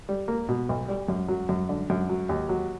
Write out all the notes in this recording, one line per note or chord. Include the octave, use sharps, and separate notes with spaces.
G3
A#3
B2
B1
G3
F#2
F#3
F#2
D3
F#2
F#3
D#2
F#3